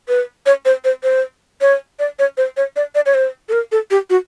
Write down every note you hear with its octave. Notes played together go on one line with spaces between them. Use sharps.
B4
C#5
C5
C5
C5
C#5
D5
C#5
C5
C#5
D5
D5
C#5
C5
A4
A#4
A4
G4
F#4